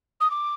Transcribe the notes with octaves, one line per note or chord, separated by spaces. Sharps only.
D#6
D6